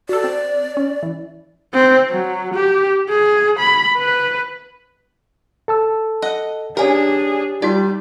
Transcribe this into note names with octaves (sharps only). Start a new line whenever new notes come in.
F#4 A4 D5
C4
C#4
E3
C4
F#3
G4
G#4
B5
B4
A4 A5 E6
D#5 F#5
C#4 D4 G4 G#4 A#4 D5
G3 D#4 F4 F#4 D5